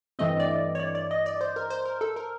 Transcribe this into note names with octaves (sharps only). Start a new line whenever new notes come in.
G2 E3 A3 C4 D#5
D5
C#5
D5
D5
D#5
D5
C5
A#4
C5
A#4
A4
A#4